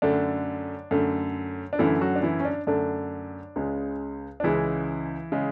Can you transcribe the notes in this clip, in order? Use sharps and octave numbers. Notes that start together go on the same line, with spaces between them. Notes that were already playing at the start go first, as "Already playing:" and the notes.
F#2 D3 A3 D4
F#2 D3 A3
D4
F#2 D3 E3 A3 E4
F#3 F#4
D4
E3 E4
C#4
D4
F#2 D3 A3 D4
C#2 C#3 G#3
D4
C#2 C#3 E3 G#3 E4
C#3 G#3